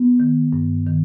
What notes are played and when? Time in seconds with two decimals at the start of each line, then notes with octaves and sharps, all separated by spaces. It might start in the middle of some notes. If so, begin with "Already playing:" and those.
Already playing: B3
0.20 D#3
0.53 G2
0.86 D#3